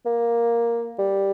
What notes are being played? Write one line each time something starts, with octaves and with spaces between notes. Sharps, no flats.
A#3
G3